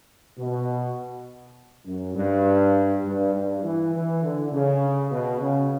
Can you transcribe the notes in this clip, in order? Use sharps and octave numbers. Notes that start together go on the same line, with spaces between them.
B2
F#2
G2
G2
G2
E3
E3
D3
C#3
B2
C#3